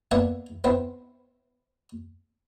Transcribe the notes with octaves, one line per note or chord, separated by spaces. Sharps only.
A#3 B3 D4 E5 F#5
B3 C4 E4